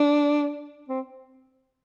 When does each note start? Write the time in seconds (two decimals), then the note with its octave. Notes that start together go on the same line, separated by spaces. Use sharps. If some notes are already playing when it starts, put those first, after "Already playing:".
Already playing: D4
0.89 C4